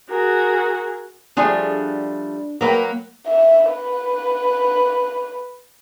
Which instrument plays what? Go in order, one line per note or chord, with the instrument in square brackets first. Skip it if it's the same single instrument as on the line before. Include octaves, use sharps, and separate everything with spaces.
[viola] F#4 [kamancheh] G#4 A#4
[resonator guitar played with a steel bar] F3 G3 A3 [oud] D4 G#4
[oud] F#3 A#3 [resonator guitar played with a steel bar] A#4 B4 G5
[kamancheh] E5
B4